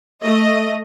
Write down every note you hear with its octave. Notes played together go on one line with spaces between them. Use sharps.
A3 D#5